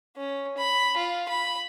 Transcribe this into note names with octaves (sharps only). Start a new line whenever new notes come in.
C#4
B5
F4
B5